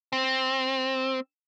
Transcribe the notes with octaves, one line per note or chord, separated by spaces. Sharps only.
C4